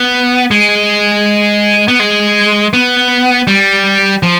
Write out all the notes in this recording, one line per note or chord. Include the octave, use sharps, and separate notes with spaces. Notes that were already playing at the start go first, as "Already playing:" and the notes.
Already playing: B3
G#3
B3
G#3
B3
G3
F3